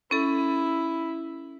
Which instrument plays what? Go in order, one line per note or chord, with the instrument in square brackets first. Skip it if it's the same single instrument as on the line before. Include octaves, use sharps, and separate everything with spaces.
[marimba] C#4 A4 [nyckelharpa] E4